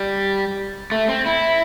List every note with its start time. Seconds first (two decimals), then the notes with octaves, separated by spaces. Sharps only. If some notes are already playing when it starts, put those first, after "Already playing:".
Already playing: G3
0.92 A3
1.08 C4
1.26 E4